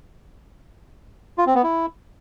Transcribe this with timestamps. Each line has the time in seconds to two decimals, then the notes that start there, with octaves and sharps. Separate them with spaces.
1.38 F4
1.46 C4
1.55 B3
1.63 E4